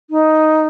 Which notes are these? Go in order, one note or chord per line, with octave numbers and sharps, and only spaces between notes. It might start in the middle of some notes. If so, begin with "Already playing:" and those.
D#4